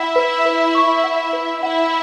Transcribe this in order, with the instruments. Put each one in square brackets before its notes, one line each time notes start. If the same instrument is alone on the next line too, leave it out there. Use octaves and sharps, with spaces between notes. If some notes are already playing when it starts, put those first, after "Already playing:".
Already playing: [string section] E4 E5 [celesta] F#5
[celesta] B4
B4
C#6
F#5
B4
[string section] E4 E5 [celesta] F#5